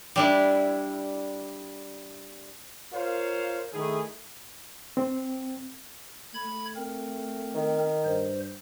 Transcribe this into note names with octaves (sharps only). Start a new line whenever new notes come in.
G3 D4 E4
F4 A#4 C5 C#5 F5
D#3 A3 E4 G#4
C4
A3 B5 G#6
C4 A#4
D#3
G2 C5